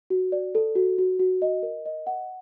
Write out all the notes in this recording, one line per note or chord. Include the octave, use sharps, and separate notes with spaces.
F#4
D5
A4
F#4
F#4
F#4
D#5
A#4
D#5
F#5